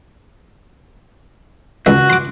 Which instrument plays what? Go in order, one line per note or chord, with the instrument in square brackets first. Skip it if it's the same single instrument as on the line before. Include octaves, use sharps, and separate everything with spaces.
[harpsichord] C#2 E5 [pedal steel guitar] F#4
[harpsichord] C6 D6